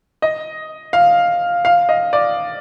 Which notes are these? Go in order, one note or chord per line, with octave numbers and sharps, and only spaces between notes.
D#5
F5
F5
D#5
D5